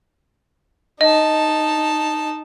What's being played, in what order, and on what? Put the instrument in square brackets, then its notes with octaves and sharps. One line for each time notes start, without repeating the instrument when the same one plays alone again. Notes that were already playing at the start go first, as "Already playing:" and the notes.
[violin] D#4 A5 [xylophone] D#5